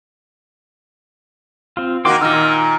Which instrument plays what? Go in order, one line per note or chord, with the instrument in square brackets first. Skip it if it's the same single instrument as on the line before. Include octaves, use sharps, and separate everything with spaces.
[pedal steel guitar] C4 F4
[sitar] D#3 A#3 F#4 [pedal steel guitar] G5 C6 D6
[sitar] A#2 D#3 [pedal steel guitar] E6 F6